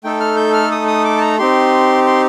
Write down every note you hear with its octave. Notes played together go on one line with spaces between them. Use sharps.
A3 D#4 A4 G5
F6
G6
F6
D#6
D#6
D6
A5
A#5
C4 D#4 G4 C6
C6